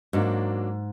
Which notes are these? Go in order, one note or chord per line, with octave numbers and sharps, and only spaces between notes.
G#2 F#3 A#3 D4 F#4